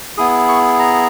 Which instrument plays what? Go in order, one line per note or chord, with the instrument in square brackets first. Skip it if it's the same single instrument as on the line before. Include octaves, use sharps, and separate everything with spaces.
[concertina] B3 E4 G#4 D#6
C#6
A#5